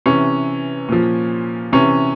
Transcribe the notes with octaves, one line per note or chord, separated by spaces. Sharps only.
C3 E3 C#4
A#2 F3
C3 E3 C#4